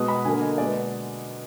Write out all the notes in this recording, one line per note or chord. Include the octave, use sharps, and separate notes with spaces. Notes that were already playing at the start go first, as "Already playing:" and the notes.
Already playing: B2 G#3 B3 D#6
B5
D3 F#3 A#3 G#5
D#5
B2 G#3 B3 D5
B4